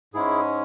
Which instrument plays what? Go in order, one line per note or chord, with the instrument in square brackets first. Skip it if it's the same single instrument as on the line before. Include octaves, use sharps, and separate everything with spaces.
[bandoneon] G#2 G#3 C#4 E4 G#4